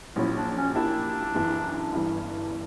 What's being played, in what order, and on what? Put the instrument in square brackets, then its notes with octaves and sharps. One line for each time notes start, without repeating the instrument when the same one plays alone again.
[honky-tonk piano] A#1 A#2 F#3 C#4 [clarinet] E4
[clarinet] D4
C#4
[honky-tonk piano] A#2 A#3 E4 G4 [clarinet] D4
[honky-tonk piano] F#1 F#2 E3
G1 G2 E3